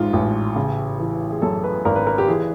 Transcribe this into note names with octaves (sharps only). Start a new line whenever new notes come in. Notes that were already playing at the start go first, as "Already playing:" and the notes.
Already playing: A1 G#2 F4
A1
C#3
E3
G#4
F#2 A4
B4
G#1 A#4
B4
A#4
G4
E3 G#4